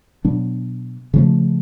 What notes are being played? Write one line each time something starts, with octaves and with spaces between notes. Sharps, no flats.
B2 F#3 B3 D4
C#3 F3 A3